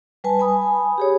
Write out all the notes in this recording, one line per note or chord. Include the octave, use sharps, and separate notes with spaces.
G3 B4 G#5 A5
G#5 B5 D#6
G4 G#4 C#5